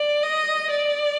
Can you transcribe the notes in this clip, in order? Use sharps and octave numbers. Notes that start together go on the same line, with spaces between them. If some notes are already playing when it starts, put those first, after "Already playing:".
Already playing: D5
D#5
D5